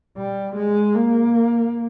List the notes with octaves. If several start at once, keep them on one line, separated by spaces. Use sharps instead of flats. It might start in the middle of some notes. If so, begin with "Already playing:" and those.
G3
G#3
A#3